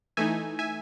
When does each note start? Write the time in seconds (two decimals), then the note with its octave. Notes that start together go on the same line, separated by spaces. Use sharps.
0.17 E3 A3 D#4 E5 G#5
0.59 E5 G#5